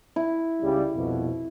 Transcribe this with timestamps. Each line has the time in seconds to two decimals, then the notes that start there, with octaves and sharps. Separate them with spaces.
0.16 E4
0.62 C#2 C#3 G3
0.94 C2 F2 B2